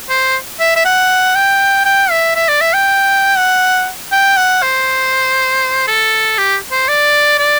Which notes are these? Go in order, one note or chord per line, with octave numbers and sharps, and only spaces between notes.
C5
E5
E5
F#5
G5
G5
E5
E5
D5
E5
G5
F#5
G5
F#5
C5
A4
G4
C5
D5
D5